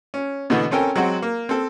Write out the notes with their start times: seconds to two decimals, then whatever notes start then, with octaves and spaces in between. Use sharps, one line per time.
0.14 C#4
0.50 B2 D3 E3 A3 B3
0.71 C4 C#4 A4 A#4 G5 G#5
0.96 F#3 G#3 C4 F#4
1.22 A#3
1.49 C4 A4